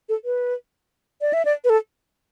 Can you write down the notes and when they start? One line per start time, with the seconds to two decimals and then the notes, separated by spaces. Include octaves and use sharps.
0.09 A4
0.25 B4
1.21 D5
1.33 E5
1.45 D5
1.64 B4
1.70 A4